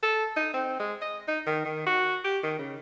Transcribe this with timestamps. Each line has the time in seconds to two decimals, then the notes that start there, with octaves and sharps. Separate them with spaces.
0.03 A4
0.36 D#4
0.54 C4
0.80 G#3
1.02 D#5
1.28 D#4
1.47 D#3
1.65 D#3
1.86 F#4
2.24 G4
2.43 D#3
2.59 C#3